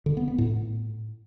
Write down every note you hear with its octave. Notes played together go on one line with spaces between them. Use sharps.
D3
B3
B3
A2